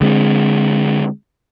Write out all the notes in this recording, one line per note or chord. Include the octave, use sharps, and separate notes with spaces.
D3 G#3 C4